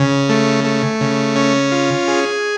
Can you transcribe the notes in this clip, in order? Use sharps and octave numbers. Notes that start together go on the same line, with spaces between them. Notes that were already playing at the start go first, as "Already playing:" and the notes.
Already playing: C#3
A3
A3
C#3
C#4
F4
G#4